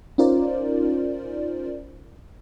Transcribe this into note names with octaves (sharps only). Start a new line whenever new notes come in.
C#4 D#4 F4 A#4 C5 D5